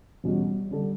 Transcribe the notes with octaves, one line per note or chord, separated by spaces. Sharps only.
E2 B2 G3 C#4 F#4
D3 G3 D4 A4